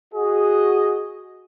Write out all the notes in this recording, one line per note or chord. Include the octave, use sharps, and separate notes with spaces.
F#4 G#4 D#5